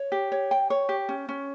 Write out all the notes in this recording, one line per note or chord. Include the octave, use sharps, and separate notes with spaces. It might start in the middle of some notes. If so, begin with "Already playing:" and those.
Already playing: C#5
G4
C#5
G5
C#5
G4
C#4
C#4